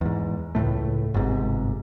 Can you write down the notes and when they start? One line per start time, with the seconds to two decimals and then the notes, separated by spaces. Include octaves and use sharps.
0.01 E2 G#2
0.55 C#2 F#2 A2 A3
1.14 G1 G#2 C3